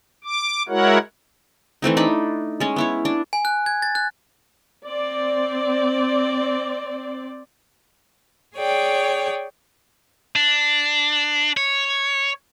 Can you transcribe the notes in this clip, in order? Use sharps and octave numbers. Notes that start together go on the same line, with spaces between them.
D6
G#3 E4 F#4 A#4 C#5 F#5
E3 A3 C4 D#4
D4 D#4 B5
G#3 C#4
B3 E4 C#5
D4
G#5
F#6
G#6
A6
F#6
C4 D5
G#4 C#5 D5 G5
D4
C#5